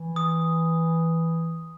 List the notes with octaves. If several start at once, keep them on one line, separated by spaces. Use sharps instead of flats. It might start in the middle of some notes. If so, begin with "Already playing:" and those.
Already playing: E3
D#6